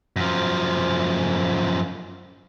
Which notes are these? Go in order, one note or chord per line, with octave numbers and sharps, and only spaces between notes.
F#2 F3